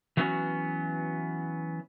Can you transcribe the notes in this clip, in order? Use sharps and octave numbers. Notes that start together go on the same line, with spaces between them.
E3 F#3 B3 C#4 F#4